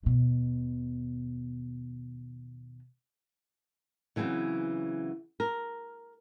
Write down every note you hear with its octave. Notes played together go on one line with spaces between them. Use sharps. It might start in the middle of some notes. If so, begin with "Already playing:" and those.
D#2 B2
C#3 E3 F#3 B3 C4
A#4